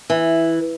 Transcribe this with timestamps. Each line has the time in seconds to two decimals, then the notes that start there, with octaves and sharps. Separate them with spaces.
0.10 E3